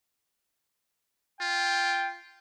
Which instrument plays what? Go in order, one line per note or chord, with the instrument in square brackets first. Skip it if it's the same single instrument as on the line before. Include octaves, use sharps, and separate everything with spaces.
[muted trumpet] F4 [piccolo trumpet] G5